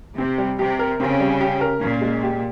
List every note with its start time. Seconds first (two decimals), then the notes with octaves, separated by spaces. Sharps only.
0.17 C3 C4
0.38 G3
0.59 C3 G4
0.79 A#4
1.00 C#3 C4
1.20 G3
1.41 G4
1.61 A#4
1.81 A#2 C#4
2.01 G#3
2.23 G4